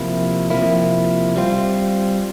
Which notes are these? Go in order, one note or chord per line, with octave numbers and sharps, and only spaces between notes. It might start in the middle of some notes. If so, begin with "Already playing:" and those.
Already playing: C3 F3 A#3 E4
C3 F3 A#3 E4
G3 C4 F4